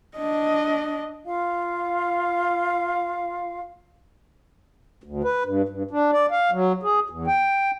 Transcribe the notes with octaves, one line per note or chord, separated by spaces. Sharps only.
D4 D#5
F4 F5
D2
B4
G2
G2
D4
D5
F5
F#3
G#4
E2
G5